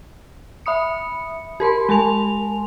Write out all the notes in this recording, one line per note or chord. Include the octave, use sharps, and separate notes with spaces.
E5 B5 D#6 C#7
G4 A#4 B5 C6
G#3 G#5 C6 F7